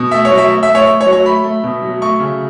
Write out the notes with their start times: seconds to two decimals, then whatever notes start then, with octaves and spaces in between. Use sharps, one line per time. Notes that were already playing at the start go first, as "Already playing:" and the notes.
Already playing: B2
0.11 A3 E5
0.25 C#5
0.31 F#3
0.38 E5
0.50 A3
0.63 E5
0.68 A3
0.75 C#5
0.88 A3
1.01 C#5
1.06 F#3
1.12 C#5
1.25 A3 B5
1.44 A3
1.64 B2
1.82 F#3
2.02 A3 C#6
2.20 C#3